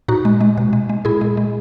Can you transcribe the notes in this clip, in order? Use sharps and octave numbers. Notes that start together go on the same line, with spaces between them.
A#2 D#4 F#4
G#3
G#3
B2
G#3
G#3
A#2 E4 G#4
G#3
G#3